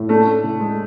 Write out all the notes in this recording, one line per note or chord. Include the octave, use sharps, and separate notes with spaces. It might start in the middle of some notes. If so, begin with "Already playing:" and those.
Already playing: A2
A3 D4
D4
A2
G#3